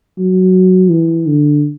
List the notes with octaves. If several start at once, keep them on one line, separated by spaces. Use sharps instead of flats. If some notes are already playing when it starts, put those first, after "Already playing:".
F#3
E3
D3